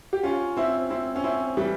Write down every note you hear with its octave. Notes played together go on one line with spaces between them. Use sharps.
G4
C#4 F4
C4 E4
C4 E4
C#4
C4 E4
E3 G3